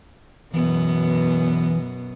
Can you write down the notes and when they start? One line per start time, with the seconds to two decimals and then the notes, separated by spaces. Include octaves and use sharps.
0.54 F#2 B2 E3 B3